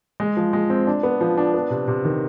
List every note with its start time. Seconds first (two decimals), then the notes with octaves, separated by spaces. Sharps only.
0.20 G#3
0.37 F3
0.53 G#3
0.70 C4
0.87 D4
1.03 B3
1.21 F3
1.37 D4
1.54 B3
1.70 C3
1.88 C3
2.05 D#3